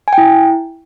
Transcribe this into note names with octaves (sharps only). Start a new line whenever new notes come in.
G#5
G5
E4